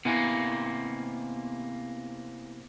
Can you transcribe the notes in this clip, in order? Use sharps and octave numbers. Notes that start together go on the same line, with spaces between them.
C3 A#3 B3 E4 G#5